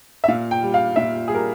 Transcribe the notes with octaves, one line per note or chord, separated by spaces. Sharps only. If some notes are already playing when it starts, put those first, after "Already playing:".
E5
A#2 F5
G5
G3
F5
A#2 E5
G#4
G3 A#4